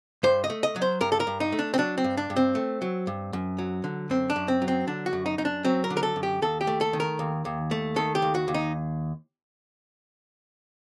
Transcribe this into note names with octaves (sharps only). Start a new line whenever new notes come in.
G2 C5
D#5
A3
D#5
F#3
C5
G2 A#4
A4
A#4
G2
D#4
A3
D4
C4
F#3 D4
C4
G2
D4
G2
C4
A3
F#3
G2
F#2
F#3
D3
F#2 C4
D4
F#2
C4
F#3
C4
D3 D4
F#4
F#2
D#4
F#2 D#4
D4
F#3 C4
A#4
D3
A#4
A4
F#2
G4
D#2 A4
G4
A3
A4
D#3
A#4
D#2
D#2
A3
D#3 A4
G4
D#2
F#4
D#2
D#4